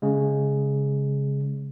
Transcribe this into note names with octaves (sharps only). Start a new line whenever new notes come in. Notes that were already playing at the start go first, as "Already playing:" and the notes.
C#3 G#3